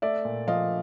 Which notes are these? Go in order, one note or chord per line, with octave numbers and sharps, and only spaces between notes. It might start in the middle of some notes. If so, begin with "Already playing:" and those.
A3 D5 E5
A#2
F3 D#5 F5